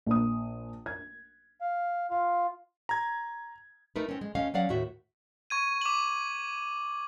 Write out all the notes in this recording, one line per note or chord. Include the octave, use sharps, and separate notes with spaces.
A#1 D#6
G#6
F5
F4 F5
A#5 G#6
A3 D#4 A#4 B4
C4 C#4
G#3
D2 A3 C#4 D#5 F5
F#3 C#4 D5 F5 F#5
D#2 A2 F#4 E5
C#6 G#6 D#7
D6 F#7